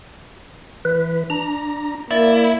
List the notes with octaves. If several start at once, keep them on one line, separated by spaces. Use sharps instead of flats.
E3 B4
D4 A#5
A#3 E4 D5